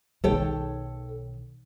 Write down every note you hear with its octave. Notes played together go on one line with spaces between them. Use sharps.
B1 D#3 A4 C#5 G5